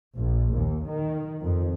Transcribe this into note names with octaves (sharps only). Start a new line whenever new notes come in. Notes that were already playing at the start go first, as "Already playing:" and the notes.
A#1
D#2
D#3
F2